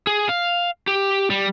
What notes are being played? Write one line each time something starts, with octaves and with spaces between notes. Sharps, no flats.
G#4
F5
G4
G3